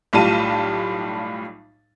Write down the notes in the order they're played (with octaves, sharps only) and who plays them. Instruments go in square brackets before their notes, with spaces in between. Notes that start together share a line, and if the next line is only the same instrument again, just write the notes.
[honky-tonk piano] B1 A2 G3 F4 A5 D#7